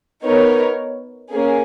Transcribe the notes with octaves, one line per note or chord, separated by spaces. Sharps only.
B3 D#4 A#4 C#5
A#3 C#4 G#4